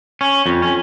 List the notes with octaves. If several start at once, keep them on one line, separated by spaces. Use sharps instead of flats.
C#4
F2
C#4